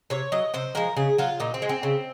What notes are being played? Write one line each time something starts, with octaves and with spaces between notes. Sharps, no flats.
C3 C#5
F#3 D#5
C3 C5
F3 G#3 A#4
C#3 G#4
F#3 F4
A#2 D#4
C4
G#3
C4
C#3